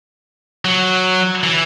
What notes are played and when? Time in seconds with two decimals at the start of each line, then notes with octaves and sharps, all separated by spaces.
0.65 F#3
1.43 E3